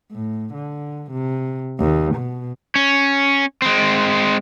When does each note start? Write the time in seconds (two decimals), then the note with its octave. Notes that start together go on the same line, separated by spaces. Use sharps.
0.12 A2
0.54 D3
1.11 C3
1.80 D#2
2.15 B2
2.75 C#4
3.62 G#3 C4